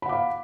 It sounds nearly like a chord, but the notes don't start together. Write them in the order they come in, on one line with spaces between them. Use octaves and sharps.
B5 F#5 D6 F5